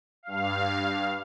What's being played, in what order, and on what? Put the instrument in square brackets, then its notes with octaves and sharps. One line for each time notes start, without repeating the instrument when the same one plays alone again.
[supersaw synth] G2 F5